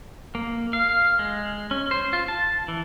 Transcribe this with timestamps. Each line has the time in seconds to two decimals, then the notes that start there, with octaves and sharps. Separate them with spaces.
0.35 A#3
0.73 F5
1.19 G#3
1.71 C#4
1.91 C5
2.13 F4
2.28 A5
2.68 E3